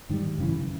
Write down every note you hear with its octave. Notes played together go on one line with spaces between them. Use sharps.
G#2 D#3 G3
F#2 C#3 E3